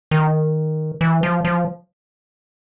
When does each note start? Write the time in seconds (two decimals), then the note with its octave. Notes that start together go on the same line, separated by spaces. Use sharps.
0.11 D#3
1.01 E3
1.23 F3
1.45 F3